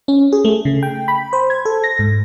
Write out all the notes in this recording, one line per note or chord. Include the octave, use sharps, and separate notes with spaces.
C#4
G#4
A3
C#3
G5
B5
C5
G#6
A4
A#6
G#2